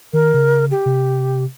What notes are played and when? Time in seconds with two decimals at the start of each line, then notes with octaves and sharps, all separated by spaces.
0.13 D#3 A#4
0.34 C#3
0.71 G4
0.86 C3